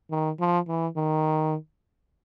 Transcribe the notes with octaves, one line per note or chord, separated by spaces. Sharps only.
D#3
F3
E3
D#3